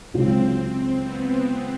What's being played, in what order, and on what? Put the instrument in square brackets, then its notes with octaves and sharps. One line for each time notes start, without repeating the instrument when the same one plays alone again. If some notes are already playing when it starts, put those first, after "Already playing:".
[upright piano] C#2 C#3 F#3 [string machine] C4
[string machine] C4
B3